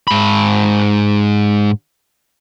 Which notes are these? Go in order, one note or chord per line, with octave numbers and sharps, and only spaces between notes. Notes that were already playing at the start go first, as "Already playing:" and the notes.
G#2 B5